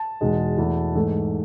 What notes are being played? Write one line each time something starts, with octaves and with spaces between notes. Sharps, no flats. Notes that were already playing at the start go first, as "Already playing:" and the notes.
Already playing: A5
E2 B2 G#3 D#4
E2 B2 A3 E4
G#2 E3 A3 D#4